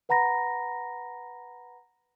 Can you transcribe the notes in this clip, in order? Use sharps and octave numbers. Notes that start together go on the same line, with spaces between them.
B4 F#5 A#5 B5 A#6